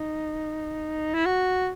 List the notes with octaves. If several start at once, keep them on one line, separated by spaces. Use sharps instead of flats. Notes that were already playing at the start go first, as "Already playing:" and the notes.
Already playing: D#4
E4
F#4